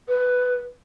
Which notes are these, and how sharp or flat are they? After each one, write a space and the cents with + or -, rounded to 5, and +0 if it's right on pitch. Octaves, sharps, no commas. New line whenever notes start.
B4 +10